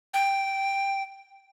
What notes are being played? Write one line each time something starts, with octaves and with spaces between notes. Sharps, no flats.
G5